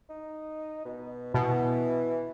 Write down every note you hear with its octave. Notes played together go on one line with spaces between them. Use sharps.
D#4
B2
B2 E3